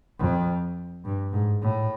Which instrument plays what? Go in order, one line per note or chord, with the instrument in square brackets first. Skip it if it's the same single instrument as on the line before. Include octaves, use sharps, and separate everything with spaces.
[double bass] F2
G2
G#2
A2